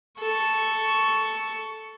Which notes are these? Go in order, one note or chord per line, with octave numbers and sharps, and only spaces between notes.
A4 C#6